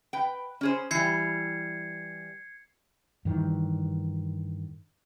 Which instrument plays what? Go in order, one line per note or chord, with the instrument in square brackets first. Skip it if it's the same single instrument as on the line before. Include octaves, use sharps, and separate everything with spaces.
[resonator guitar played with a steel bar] B4 G5
C#4 G#4 C5
[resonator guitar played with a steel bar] E3 G3 [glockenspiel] G#6 C7 C#7
[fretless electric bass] G2 D#3 E3